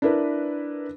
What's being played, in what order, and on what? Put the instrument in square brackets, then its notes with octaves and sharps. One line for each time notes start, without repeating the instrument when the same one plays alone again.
[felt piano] D4 E4 A#4 B4